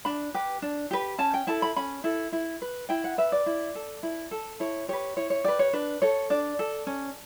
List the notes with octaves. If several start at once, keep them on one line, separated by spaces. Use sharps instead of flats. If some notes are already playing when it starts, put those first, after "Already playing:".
D4 B5
G4 B4
D4
G4 B4
C#4 A5
G5
E4 A4 A5
B5
C#4 B5
E4 A4
E4
B4
E4 G5
F#5
B4 E5
D5
E4
A4
E4
A4
E4 C#5
G4 B4 C#5
E4 C#5
C#5
G4 B4 D5
C#5
D4 B4
A4 C#5
D4 D5
A4
C#4